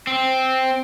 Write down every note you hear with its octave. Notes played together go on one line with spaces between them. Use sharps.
C4